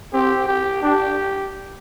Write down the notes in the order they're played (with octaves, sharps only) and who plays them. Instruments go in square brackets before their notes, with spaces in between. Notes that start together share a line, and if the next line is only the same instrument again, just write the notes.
[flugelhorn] C4 [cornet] G4
[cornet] G4
[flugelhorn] D4 [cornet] G4